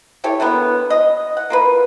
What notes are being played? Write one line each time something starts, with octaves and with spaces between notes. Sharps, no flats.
E4 G4 A4 C#5
D3 F#3 A#3 B3
D#5
F#5
A#3 F4 B4